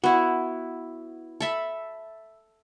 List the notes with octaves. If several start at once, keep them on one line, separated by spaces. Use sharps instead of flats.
B3 E4 F#4
A4 E5 B5